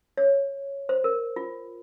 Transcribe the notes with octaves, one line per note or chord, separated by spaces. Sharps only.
C#5
C5
A#4
F4